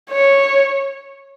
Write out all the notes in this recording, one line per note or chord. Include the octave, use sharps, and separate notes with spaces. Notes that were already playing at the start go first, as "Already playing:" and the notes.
C#5